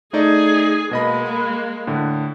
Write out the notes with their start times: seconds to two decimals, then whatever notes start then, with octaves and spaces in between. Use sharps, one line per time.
0.13 A3 D#4 G#4 D5
0.91 B2 G#3 A#3 D#5 B5
1.26 B5
1.87 A2 D3